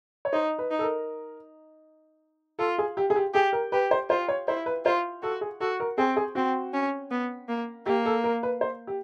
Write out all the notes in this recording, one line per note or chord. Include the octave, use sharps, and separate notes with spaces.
C#5
D#4 C5
B4
D#4
A4
A#4
F4 A4
G#4
G4
G#4
G4
G4 G#4
A#4
G4 B4
C5
F4 C5
C#5
E4 C5
B4
F4 C5
F#4 A4
G#4
F#4 A4
A#4
C4 G#4
G#4
C4 F#4
C#4
B3
A#3
A#3 G4
A4
A#4
B4
C5
G4